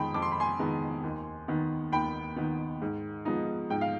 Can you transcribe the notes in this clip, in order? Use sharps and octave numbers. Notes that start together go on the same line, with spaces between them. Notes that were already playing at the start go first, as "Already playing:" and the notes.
Already playing: F2 D#3 G#3 B3 D#4 G5 B5 C6
F2 D6
C6
B5
G#5 C6
D#3 G#3 B3 D#4
D#2
D#3 B3
D#2 G5 B5
D#3 B3
G#2
F3 G#3 B3 D#4
G#2 G5
F5